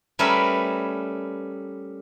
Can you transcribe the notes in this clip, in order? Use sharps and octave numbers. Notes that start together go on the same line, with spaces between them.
G3 A3 C#4 A#4 B4 E5